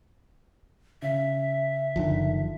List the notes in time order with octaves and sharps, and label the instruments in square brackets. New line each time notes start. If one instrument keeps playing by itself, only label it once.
[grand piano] C#3 [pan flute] E5
[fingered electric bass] F#1 F3 [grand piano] D3 D#3